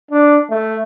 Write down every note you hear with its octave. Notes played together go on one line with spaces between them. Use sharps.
D4
A3